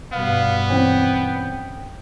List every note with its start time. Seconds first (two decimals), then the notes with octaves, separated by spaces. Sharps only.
0.12 G2 B2 B3 F5
0.70 E3 C4 C#4 G5